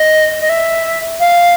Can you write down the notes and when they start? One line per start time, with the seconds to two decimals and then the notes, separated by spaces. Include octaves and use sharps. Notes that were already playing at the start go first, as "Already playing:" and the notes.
Already playing: D#5
0.41 D#5
0.49 E5
1.20 F5